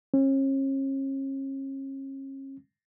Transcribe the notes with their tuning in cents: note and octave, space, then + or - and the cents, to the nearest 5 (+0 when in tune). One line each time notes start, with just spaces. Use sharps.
C#4 -40